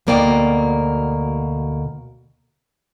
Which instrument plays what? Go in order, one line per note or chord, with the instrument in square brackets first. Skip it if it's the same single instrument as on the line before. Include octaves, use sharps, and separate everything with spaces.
[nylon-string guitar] D2 B2 A#3 D5 G5